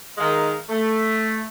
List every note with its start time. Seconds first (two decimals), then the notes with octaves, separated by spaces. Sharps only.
0.18 D#3 G#3 F5
0.69 A3